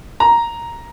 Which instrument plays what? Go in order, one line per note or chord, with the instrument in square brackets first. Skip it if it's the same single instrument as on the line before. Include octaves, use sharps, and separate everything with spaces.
[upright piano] A#5